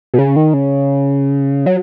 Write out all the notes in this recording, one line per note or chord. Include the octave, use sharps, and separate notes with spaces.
B2
C#3
D#3
C#3
F#3